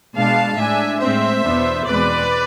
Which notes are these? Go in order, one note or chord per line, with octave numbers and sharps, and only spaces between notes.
B2 G#3 D4 F5 A5
A2 G#3 D4 E5 G#5
A2 G#3 C4 C5 E5
E2 B2 B3 D4
E2 B2 G#3 C4 B4 D5